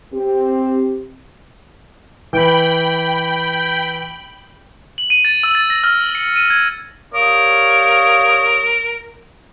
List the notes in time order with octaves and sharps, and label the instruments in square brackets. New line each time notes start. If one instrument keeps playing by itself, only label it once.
[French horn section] C4 G4
[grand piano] E3 B4 [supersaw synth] G5 B5
[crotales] F#7
D#7
A6
E6
A6
A#6
F6
F#7
C#7
D#7
G#6
[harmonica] G3 F5 D#6 [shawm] A#4 [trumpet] C#5